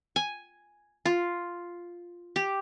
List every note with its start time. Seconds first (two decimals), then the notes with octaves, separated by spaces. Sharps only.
0.16 G#5
1.05 F4
2.36 G4